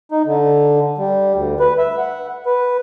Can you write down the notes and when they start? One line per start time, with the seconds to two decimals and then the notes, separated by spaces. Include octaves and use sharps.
0.12 D#4
0.26 D3
0.98 G3
1.35 D2
1.60 B4
1.78 E5
1.98 F#5
2.46 B4